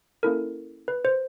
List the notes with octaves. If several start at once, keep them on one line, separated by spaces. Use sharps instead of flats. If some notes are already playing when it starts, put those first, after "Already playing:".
A#3 C#4 E4 A4 A#4
B4
C5